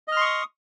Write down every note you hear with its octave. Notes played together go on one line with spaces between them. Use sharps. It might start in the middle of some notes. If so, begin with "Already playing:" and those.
D#5 C6 C#6 D#6 F6